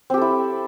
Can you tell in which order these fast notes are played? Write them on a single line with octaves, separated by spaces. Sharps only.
C4 G4 A4 E4